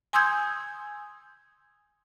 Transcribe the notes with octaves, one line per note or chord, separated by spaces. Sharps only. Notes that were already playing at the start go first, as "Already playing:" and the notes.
G#5 C6 D#6 E6 G6 G#6